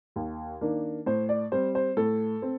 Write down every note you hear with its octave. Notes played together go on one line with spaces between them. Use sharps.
D#2
D#3 A#3 D4
A2 C5
D5
G3 C4 C5
C5
A2 A4
C4